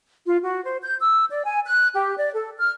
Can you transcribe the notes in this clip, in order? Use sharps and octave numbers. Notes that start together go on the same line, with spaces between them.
F4
F#4
C5
G6
E6
D5
G#5
F#6
G4
D5
A4
F6